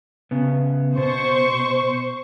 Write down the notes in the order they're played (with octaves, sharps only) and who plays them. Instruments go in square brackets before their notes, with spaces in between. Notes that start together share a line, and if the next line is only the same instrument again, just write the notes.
[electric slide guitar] C#3 B3
[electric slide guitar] B2 [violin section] C5 C#6